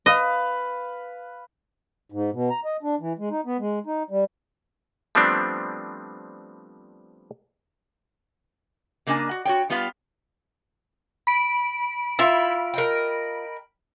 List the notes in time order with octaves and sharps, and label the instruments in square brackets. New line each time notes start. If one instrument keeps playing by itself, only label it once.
[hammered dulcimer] B4 F5 [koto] D#5
[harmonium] G#2
B2
A#5
D#5
D4
E3
G#3
D#4
B3
G#3
D#4
G3
[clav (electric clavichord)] F3 G3 A3 B3 C4 D4
[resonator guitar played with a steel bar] C#3 A#3 D4 D#5 G#5
F#4
F#4 C#5 G5
G3 B3 F4 B4 F5
[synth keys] B5 D7
[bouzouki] E4 [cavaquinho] F4 E5
[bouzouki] A#4 D#5 G5